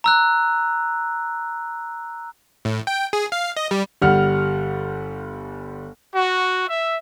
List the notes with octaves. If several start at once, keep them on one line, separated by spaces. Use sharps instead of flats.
A#5 E6 F#6
A2
G5
G#4
F5
D#5
G3
G1 G3 F#5 F6
F#4
E5